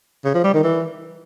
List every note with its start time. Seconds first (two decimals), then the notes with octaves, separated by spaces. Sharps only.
0.25 C#3
0.35 F3
0.44 G3
0.54 D#3
0.64 E3